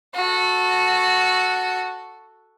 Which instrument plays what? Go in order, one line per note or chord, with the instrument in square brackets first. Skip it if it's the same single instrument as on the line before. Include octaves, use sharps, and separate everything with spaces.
[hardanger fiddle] F#4 A4